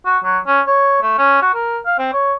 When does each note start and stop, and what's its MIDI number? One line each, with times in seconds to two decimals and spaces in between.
0.05 0.18 66
0.24 0.38 54
0.47 0.61 61
0.66 0.98 73
1.02 1.14 57
1.18 1.40 61
1.42 1.52 66
1.54 1.79 70
1.86 1.95 77
1.99 2.12 60
2.13 2.34 73